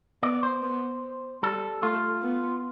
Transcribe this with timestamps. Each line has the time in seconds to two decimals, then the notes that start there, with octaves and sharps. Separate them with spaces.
0.23 B3 D5
0.43 C5
0.62 B3
1.43 G3 A4
1.82 A3 F4
2.22 B3